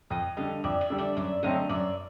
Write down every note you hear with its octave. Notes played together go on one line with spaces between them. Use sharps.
F2 D#5 F5
D3 G3 D#5 F5
F2 D5 E5
D5 E5
D3 G3
D5 E5
F#2 D5 E5
D3 F#3 A3 C4 D#5 F5
F#2 D5 E5